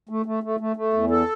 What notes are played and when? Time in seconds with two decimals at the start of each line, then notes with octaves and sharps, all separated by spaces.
0.09 A3
0.26 A3
0.43 A3
0.60 A3
0.76 A3
0.93 E2
1.10 A4